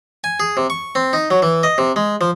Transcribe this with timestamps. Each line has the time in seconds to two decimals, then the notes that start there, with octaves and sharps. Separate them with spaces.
0.24 G#5
0.40 G#4
0.57 C3
0.70 C#6
0.95 C4
1.13 D#4
1.30 F#3
1.42 E3
1.63 D#5
1.78 C3
1.96 G#3
2.21 F3